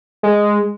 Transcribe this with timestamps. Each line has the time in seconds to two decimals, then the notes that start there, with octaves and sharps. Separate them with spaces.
0.23 G#3